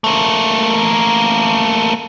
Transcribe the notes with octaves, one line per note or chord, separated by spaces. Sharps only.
A3 A#3